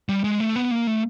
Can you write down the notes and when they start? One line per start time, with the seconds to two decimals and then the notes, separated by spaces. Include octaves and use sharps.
0.09 G3
0.24 G#3
0.40 A3
0.56 B3
0.71 A#3
0.87 A3